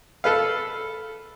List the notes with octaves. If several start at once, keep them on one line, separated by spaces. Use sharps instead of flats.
A4 B4 F5